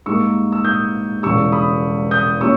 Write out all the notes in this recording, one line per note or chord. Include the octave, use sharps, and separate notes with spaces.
G#2 G3 A#3 C#6 E6
E6
D#6 G6
E1 E2 C#3 G3 C#6 E6
B5 D#6
D#6 G6
A#2 G3 C#4 E4 C#6 E6